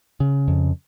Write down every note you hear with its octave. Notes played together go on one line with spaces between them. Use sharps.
C#3
F2